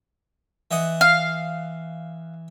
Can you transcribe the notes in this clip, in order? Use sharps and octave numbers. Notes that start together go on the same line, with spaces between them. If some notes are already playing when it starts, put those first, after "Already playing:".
E3 D#5 F#5
F5